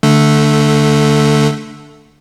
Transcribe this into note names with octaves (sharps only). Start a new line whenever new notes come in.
D3 A3